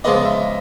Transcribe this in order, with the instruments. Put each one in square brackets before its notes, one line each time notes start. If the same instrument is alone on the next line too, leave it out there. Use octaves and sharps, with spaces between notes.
[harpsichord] C#3 F3 G#3 B3 D4 [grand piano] D#5
[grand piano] E5